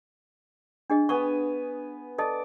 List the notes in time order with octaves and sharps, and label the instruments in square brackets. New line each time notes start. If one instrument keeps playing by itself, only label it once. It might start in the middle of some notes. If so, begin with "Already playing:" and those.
[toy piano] D4 G#4 D#5
[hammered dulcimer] B3 G#5 [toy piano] C#6
[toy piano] A4 D#5 A5 [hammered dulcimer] D5